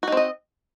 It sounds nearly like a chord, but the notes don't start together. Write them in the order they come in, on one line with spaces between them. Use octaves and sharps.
F#4 D#4 C4 D#5